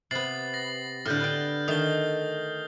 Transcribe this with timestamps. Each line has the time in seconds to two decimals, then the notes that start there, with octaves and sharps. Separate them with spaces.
0.11 C3 B3 A6 C7 F#7
0.54 A6 A#6
1.05 A2 D3 F6 G6
1.20 B3 G5
1.68 D#3 A3 D#6 G7